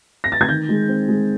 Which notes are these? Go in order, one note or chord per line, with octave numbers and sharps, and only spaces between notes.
A#6
A6
G#6
D#3 G6
G#3
C4
G#3